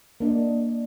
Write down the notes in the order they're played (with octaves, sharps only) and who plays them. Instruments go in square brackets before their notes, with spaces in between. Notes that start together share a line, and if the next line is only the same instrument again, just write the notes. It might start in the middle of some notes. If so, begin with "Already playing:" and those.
[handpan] A#3 D4 D5 D#5